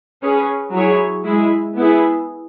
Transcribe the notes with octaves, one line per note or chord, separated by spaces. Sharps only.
C#4 G#4 B4
F#3 E4 G#4 C#5
G#3 E4 G#4
B3 E4 G#4